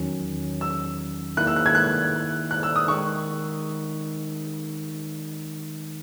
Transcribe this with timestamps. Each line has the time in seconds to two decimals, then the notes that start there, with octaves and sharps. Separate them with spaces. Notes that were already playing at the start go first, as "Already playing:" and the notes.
Already playing: E2 D#3 F#3 C#4
0.61 E6
1.37 D#3 A#3 E4 F#6
1.47 E6
1.56 F#6
1.66 G#6
1.75 F#6
2.51 F#6
2.63 E6
2.76 D#6
2.88 D#3 G#3 D#4 C#6